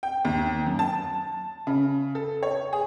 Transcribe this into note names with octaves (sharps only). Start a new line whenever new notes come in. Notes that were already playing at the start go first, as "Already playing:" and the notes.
G5
D#2
F#2
A5
C#3
A4
C#5
G#4